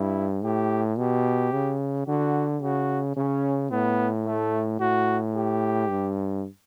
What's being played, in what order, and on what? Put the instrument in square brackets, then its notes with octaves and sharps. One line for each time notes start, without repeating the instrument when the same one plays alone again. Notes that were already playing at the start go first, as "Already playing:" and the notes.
Already playing: [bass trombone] G2 [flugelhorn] E4
[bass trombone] A2 [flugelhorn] G4
[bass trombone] B2 [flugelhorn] G4
[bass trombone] C#3
[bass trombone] D3 [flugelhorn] F#4
[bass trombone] C#3 [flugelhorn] F#4
[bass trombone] C#3 [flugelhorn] C#4
[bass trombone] A2 [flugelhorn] B3
[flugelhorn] A3
[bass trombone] A2 [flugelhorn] F#4
[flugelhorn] G4
[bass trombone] G2